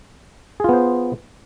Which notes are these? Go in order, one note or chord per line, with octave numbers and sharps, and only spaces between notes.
B3 F4 G#4 C5